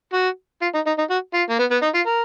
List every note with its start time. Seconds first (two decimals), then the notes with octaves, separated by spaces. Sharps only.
0.13 F#4
0.62 F4
0.74 D#4
0.86 D#4
0.98 D#4
1.10 F#4
1.34 F4
1.49 A#3
1.59 B3
1.71 B3
1.82 D#4
1.95 F4
2.07 A#4